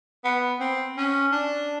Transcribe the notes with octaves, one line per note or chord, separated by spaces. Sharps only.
B3
C4
C#4
D4